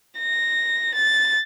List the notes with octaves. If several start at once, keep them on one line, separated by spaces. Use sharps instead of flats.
A#6
A6